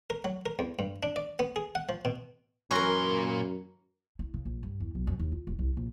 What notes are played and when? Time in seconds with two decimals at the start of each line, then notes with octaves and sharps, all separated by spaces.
0.10 A#4
0.24 F#3
0.46 A#4
0.59 E2
0.79 G2
1.03 D4
1.16 D5
1.39 B3
1.56 G#4
1.75 F#5
1.89 F3
2.05 B2
2.71 F#2 A#2 E3 C#4 F#4 A#4 A#5 C6
4.19 E4
4.34 C#3
4.45 A#1
4.63 G2
4.80 E2
4.95 B1
5.07 F#2
5.19 D#2
5.32 F4
5.47 D#1
5.59 C2
5.77 A#1